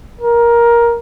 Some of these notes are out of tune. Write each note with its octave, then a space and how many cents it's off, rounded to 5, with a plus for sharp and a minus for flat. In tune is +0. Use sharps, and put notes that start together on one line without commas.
A#4 +15